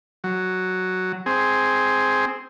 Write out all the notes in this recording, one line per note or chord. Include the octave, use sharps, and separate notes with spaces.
F#3
C4 G#4